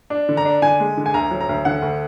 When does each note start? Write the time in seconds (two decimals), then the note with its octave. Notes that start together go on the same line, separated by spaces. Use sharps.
0.10 D4
0.29 D3
0.37 A#5
0.45 D4
0.62 D3 G#5
0.80 G#3
0.97 D3
1.06 G#5
1.14 D2 A#5
1.31 F#3
1.40 A#5
1.49 D2
1.65 D3 F#5
1.82 D2